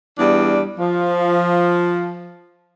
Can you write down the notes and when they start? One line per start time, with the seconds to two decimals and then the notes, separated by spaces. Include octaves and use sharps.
0.18 E2 G3 D4
0.78 F3